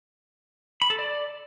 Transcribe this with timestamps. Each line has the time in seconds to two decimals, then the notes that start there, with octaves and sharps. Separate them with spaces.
0.82 B5
0.90 A4
0.99 D5